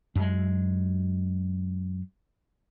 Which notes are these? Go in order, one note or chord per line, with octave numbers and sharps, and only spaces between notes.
F#2 G#3